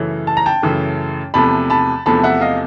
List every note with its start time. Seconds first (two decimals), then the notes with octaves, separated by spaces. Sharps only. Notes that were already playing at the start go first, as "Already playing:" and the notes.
Already playing: F#2 C#3 E3 A3
0.27 A5
0.37 A#5
0.46 G5 A5
0.63 F#2 C#3 E3 A3
1.34 E2 C3 F3 A3 A5 B5
1.70 A5 B5
2.06 E2 C3 F3 A3 A5 B5
2.24 E5 F#5
2.41 D#5 F5